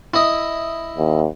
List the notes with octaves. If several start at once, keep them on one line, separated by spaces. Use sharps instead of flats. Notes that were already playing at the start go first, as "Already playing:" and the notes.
E4 D#5
D#2